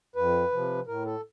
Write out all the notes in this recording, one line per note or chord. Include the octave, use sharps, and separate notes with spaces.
F2 B4
C3 F3
A2 A#4
A4